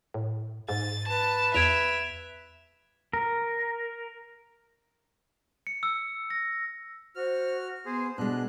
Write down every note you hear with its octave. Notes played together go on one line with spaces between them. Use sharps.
A2
G#2 A6
B4 A5
E2 E5 G#6 D7 F7
A#4
C#7
E6
A#6
F#4 C5 F6
B3 G#4 C5
B2 G#3 B3 D4 F#6